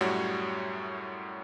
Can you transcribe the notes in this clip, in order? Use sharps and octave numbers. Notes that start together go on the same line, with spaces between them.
F#2 A2 G3 F#4 C#5